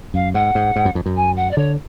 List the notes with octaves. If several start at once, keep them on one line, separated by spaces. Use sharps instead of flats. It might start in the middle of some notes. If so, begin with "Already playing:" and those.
F#2 F5
G#2 F#5
G#2
G#2
F#2
F2
F#2
G#5
F#5
D5
D3 C#5